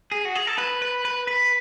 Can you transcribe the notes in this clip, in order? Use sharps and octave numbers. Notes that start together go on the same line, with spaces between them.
G#4
F#4
G#4
A4
B4
B4
B4
B4